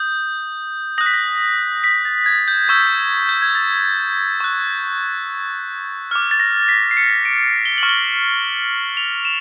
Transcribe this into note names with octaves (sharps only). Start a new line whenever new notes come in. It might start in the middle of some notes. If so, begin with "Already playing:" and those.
Already playing: D#6 G6
D#6 F#6 A#6
B6
A#6
B6
A6
G#6
G6
C#6 E6 G6 G#6
G6
G#6
A6
C#6 F#6
D6 F6
A6
A#6
B6
C7
C#7
D7
G7
C#6 F6 F#7
G7
F7
E7